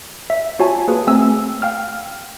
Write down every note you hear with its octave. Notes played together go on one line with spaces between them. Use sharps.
E5
F4 F#4 C#5 G#5 A5
A#3 G#4 B4 D#6
A3 C4 G#5 E6
F5 G5 F6